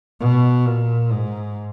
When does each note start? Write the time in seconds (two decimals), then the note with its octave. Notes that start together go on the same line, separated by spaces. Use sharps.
0.21 B2
0.66 A#2
1.12 G#2